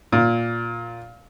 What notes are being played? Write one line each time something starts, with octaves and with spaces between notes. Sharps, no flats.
A#2